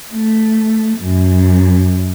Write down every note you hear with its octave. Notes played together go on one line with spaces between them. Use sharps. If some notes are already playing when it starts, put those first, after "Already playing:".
A3
F#2